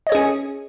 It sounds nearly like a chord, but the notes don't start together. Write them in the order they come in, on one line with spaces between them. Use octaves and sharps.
D#5 C#5 G#4 C#4